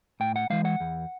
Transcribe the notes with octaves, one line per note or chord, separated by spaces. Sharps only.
A2 G5
F#5
E3 G#3 F5
F#5
E2